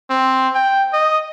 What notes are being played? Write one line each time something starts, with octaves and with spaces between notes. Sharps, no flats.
C4
G5
D#5